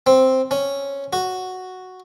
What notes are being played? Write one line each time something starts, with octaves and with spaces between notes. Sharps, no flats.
C4
C#4
F#4